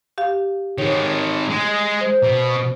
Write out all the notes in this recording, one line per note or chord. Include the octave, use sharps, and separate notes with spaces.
G4 F5
D#3 G#3 C#5
G#3
C5
B2